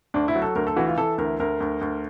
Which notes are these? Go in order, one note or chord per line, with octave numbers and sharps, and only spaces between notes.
D2 D4
E4
F#3
A4
D2 A#4
A4
E3 F#4
F4
E3 A4
D2 A#4
D2 A#4
D2
D2